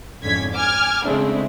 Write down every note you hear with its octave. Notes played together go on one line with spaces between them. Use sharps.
F2 G#2 D3 C#4 G#6 B6
G#5 D6 F6 G#6
C#3 G#3 A3 C4 D4 E4